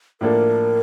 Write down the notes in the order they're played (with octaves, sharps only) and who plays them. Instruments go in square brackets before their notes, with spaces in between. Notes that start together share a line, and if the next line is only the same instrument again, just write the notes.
[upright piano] A2 F3 A#3 D4 A4 [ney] A#4